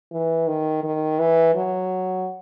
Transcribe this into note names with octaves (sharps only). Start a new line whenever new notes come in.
E3
D#3
D#3
E3
F#3